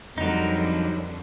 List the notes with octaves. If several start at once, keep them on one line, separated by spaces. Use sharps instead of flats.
F2 D3 F#3 G3 D#4 A#4